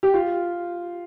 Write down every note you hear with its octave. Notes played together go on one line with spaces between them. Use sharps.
G4
F4